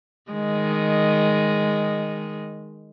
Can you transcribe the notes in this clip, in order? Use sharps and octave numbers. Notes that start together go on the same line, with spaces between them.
D#3 G#3